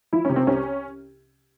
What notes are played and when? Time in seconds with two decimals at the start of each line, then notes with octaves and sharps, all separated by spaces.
0.13 F3 E4
0.25 C3 C#4
0.36 C4
0.47 C2 C#4